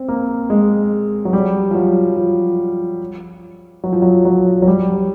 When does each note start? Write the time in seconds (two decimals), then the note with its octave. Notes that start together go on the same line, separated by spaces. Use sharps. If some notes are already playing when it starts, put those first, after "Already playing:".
Already playing: C4
0.08 A#3
0.50 G#3
1.25 F#3
1.33 G3
1.71 F3
1.75 F#3
2.17 F3
3.84 F#3
3.92 F3
4.02 F#3
4.25 F#3
4.62 F#3
4.67 G3